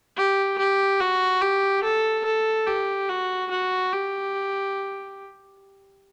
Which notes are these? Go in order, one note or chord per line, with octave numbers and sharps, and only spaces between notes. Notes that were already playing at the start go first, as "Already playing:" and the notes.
G4
G4
F#4
G4
A4
A4
G4
F#4
F#4
G4